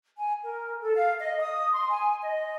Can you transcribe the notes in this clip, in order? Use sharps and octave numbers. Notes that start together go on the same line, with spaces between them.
G#5
A#4
A4
F5
D#5
D#6
C6
G#5
D#5